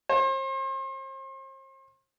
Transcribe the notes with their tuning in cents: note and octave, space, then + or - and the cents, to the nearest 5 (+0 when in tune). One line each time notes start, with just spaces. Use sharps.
C5 +40